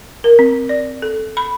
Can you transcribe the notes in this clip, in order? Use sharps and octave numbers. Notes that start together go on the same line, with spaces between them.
A#4
C4
D5
A4
B5